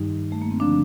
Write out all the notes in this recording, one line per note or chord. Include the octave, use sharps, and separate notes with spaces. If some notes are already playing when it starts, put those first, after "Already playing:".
Already playing: G2 D#3 G3 D#4
A3
A#3
C4
D3 F3 D4